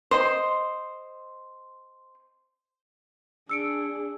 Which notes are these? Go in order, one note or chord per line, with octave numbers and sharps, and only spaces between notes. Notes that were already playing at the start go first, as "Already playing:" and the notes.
C5 D#5 C6
D4 G#4 E6 C#7 D7